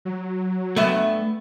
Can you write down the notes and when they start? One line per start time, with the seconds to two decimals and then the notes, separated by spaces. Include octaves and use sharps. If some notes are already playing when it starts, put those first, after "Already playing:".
0.05 F#3
0.76 G2 A3 B3 E5